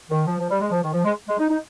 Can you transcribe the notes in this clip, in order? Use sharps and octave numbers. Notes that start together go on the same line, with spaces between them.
D#3
F3
F3
G3
G#3
F3
D#3
F3
G#3
G#3
D#4
D#4